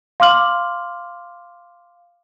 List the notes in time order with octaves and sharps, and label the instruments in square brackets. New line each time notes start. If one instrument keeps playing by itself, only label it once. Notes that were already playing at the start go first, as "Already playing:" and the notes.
[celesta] F5 C6 D6 F6 F#7